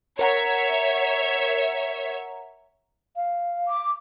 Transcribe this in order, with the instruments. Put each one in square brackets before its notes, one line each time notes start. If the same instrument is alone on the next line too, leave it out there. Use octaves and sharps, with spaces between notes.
[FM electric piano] A#4 F#5 A#5 [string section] C#5 E5
[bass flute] F5
[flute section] D6